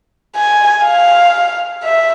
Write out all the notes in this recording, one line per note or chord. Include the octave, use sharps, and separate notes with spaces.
G#5
F5
E5